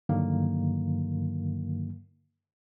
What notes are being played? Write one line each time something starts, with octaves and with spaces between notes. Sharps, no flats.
G2 D3 D#3 F#3 A#3